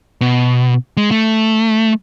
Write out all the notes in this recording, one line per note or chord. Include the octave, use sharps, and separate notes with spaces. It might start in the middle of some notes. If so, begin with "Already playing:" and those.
B2
G#3
A3